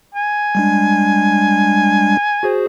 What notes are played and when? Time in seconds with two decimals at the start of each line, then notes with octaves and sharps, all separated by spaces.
0.15 G#5
0.55 G3 G#3 D4
2.43 F#4 G#4 C5